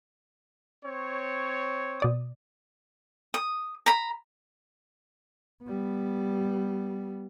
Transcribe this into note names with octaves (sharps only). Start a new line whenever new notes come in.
C4 C#5
B2 D5 D#6
D#6
A#5 B5
G3 B3